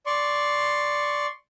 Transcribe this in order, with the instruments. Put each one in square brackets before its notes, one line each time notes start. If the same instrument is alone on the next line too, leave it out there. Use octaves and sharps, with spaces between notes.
[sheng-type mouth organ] D5 C6 C#6